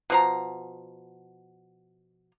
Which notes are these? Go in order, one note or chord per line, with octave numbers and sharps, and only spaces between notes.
B2 F3 A#5